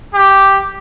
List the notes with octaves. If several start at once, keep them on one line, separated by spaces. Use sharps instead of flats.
G4